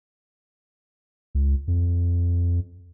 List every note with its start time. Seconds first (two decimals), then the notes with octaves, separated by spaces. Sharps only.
1.35 C#2
1.68 F2